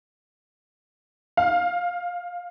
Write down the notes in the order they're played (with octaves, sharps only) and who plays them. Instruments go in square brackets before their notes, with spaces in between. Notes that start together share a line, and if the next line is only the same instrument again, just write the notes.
[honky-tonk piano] F5